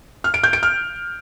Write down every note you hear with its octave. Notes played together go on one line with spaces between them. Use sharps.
F6
D7
G6
D7
F6